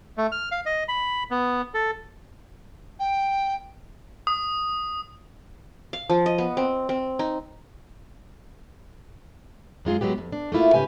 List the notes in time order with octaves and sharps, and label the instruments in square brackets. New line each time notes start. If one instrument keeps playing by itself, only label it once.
[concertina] A3
F6
F5
D#5
B5
B3
A4
[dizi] G5
[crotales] D#6
[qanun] F5
F3
D#5
B3
C4
C4
D#4
[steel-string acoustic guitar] F#2 G#3 F4 G#4
F#3 G#3 B3 G4
F2
D4
A3 A#3 E4 F4
G#2 C#3 G4 B4 G#5